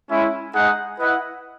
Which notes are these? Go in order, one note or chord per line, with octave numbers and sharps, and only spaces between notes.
G#3 C#4 E4
G#3 D#4 G#4 D#5 F#5
E4 B4 D#5 F#5